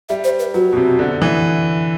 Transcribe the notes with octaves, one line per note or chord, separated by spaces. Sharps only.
G3 E5
C5
B4
F#3 F#4
B2
C3
D3
E3